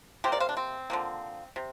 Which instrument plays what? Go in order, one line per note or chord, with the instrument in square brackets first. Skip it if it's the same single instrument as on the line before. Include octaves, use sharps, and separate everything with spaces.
[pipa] C3 G4 C5
A#3 A#4 D5
C5 F5
D4
C4
D3 F3 A#3
C3